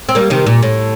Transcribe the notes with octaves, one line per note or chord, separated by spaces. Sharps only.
C4
G3 A#3
C3 D#3
A#2
A2